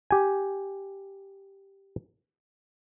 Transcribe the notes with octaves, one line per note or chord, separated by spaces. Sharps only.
G4 G#5